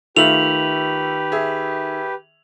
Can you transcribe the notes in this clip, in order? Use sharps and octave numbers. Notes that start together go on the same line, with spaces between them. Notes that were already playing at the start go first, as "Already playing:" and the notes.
D#3 A3 F4 G4 B4 E5 F7 F#7
G#4 E5